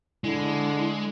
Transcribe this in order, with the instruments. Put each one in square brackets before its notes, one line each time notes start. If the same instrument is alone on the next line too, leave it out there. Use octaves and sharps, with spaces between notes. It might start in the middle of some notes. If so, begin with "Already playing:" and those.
[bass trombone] D3 [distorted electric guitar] G#3 [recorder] E4